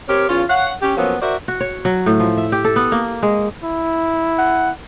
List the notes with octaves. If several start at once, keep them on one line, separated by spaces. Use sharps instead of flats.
C4 G4 A#4 C#5
E2 C#4 F4
C#5 F5 F#5
C#4 G4
F3 F#3 A#3 B3 C#4
F#4 A#4 C5 D5 E5
F#4
C#5
F#3
A2
F3
E5
G4
A4
B3
A#3
G#3
E4
F#5